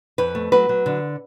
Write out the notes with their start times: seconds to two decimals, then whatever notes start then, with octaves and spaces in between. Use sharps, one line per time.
0.18 F2 B4
0.35 A3
0.52 F#3 B4
0.69 F#3
0.86 D3